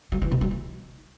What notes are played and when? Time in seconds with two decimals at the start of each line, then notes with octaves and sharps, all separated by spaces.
0.12 F#3
0.22 E3
0.31 B2
0.41 F#3
0.51 D#4